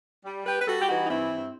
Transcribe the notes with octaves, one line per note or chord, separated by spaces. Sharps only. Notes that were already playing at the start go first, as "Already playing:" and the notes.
G3
G3 G4 B4
B4
G3 F#4 A4
G4
E3 D#4 F#4
D#4
G2 C4 E4
G2